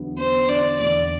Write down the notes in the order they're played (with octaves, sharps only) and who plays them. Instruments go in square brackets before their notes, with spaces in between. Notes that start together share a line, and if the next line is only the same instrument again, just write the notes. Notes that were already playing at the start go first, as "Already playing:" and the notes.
Already playing: [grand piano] E2 D3 F#3 B3
[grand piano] B3 [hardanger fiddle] C5
[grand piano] D3 [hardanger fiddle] D5
[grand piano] E2 [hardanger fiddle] D5